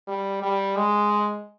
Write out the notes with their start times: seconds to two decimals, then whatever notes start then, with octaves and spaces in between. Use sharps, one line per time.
0.08 G3
0.43 G3
0.77 G#3